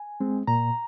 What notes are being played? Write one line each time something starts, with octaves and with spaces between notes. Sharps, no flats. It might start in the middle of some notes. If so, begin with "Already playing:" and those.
Already playing: G#5
G#3 C4
A#2 A#5